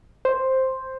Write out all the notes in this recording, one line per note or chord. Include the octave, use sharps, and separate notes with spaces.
C5